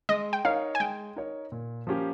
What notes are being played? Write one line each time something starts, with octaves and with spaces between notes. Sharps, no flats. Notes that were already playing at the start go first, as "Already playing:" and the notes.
G#3 D#5
G5
D#4 A#4 C#5 F5
G#5
G#3 G5
D#4 A#4 C#5
A#2
F3 A#3 C#4 G4